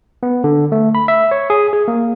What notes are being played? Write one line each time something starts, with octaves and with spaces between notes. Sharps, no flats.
B3
D3
A3
B5
E5
C#5
G#4
G#4
A#3